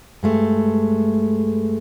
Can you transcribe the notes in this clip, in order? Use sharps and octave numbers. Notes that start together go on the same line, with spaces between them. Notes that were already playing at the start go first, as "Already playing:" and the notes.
G2 G#3 A3